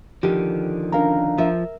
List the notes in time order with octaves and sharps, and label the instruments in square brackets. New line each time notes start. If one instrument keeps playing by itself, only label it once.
[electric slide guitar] D3 D#3 F3 [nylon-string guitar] G4
[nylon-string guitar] C#4 A#4 [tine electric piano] D4 F5 A#5
[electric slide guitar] F3 [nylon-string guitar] A#4 E5